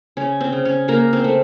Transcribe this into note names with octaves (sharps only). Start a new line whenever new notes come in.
C#3 C#4
C4
C#3
C#4
C#3 A#3 A#4
C4 C5
A3